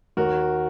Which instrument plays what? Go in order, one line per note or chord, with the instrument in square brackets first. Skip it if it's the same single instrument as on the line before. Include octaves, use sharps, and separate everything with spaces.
[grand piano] D#2 F#4 A#4